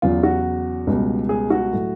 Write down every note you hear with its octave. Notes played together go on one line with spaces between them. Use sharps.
E2 C#3 F#3 F4
F#4
C#2 B2 G3
G#4
F#4
A2 F#3